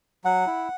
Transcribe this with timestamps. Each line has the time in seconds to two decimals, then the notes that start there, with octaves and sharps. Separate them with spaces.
0.25 F#3 F#5
0.47 E4